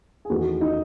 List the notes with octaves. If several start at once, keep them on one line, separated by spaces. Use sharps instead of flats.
G#4
E2 D#3 A3 F#4
D#4